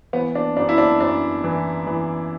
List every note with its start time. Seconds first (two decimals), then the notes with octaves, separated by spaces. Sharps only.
0.13 E3 B3
0.35 D4
0.57 F#2 D4
0.69 E4
0.78 D4
1.00 F#2 D4
1.44 E3
1.87 E3